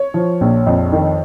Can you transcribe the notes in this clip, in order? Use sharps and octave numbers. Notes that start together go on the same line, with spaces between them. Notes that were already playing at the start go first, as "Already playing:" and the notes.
Already playing: C#5
F3
A#1
F2
D#3